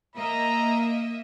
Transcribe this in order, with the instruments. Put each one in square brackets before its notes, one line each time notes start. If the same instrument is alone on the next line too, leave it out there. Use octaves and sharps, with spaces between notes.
[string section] A#3 D#5 E5 [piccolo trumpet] A#5